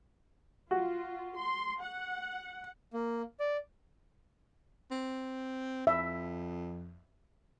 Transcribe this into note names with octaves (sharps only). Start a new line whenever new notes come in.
F4 F#4
C6
F#5
A#3
D5
C4
F2 E5